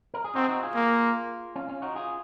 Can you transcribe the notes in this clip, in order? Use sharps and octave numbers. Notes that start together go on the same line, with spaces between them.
A#4
G#4
C4 D#4 F#4
G#4
D#4 F#4
F4 G#4
A#3
C#4 F4
C#4 F4
D#4 F#4
F4 G#4